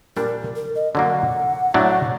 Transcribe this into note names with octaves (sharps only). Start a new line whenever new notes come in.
A#2 G3 D4 A#4
A#4
D#5
D3 F#3 A#3 F#5
A2 F#3 A3 D4